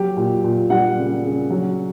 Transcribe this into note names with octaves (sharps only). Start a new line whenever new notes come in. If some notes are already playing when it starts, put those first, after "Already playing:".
Already playing: F#3 G4
A#2
A#2
G3 F#5
C#3
C#3
F#3